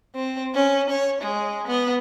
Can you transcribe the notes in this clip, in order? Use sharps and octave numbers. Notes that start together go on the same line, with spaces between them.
C4
C#4
C#5
G#3
B3